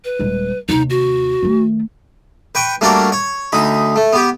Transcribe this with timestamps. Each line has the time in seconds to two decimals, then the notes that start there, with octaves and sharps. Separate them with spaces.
0.05 B4
0.19 D#1 G#3
0.69 D#2 C3 D#4
0.90 F#4
1.43 D#3 A3
2.55 B4 G5 C#6
2.81 G3 A3 A#3 D4 F#4 A#4
3.12 C#5
3.52 D2 D#4 B5
3.96 A3
4.13 B3 G4